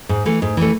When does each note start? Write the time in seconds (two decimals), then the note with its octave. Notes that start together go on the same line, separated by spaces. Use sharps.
0.09 G#2
0.26 E3 A3
0.42 G#2
0.57 E3 A3